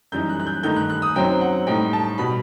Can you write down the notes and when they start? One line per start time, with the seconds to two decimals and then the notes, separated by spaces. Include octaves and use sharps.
0.12 F#2 E3 G3 D#4 G6
0.29 F#6
0.40 F#6
0.47 G6
0.63 G2 D#3 A3 D#4 G6
0.76 F#6
0.90 F#6
1.02 D#6
1.15 F#2 F#3 C4 D#4 G5
1.41 F#5
1.67 A2 G3 D#4 G5
1.93 A5
2.18 B2 G3 B5